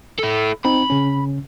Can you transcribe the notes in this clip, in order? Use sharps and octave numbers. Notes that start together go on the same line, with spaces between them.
E4 A4
C4 D#4 B5
C#3 C#4